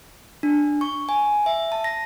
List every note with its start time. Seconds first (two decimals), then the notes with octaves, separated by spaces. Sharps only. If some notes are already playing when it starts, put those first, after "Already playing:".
0.43 D4
0.81 C#6
1.09 G#5
1.46 E5
1.72 A5
1.84 A#6